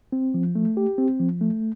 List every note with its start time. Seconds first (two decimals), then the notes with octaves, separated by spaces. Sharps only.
0.12 C4
0.34 F3
0.55 A3
0.77 G4
0.98 C4
1.20 F3
1.41 A3